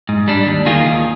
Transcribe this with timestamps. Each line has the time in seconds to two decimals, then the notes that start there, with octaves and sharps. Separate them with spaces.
0.09 G#2
0.28 G3 D4
0.47 D#2
0.66 D#3 A#3 F4 G#4
0.85 D#2